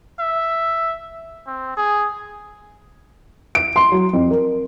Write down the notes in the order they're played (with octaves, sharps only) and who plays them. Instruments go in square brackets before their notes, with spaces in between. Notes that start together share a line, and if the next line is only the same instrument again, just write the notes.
[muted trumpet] E5
C4
G#4
[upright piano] D7
C6
F#3
F2
A#4